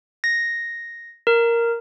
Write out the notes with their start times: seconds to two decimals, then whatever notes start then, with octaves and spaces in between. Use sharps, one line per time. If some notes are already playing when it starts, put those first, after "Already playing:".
0.24 A#6
1.27 A#4